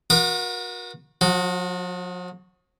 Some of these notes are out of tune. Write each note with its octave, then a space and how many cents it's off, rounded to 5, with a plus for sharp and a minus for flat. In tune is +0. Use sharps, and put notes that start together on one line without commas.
F#4 -30 A#4 +35 D#6 -40
F3 +45 F#4 +0